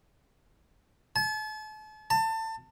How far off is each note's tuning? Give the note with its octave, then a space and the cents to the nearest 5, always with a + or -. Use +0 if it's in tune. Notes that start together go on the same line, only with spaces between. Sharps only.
A5 -40
A5 +25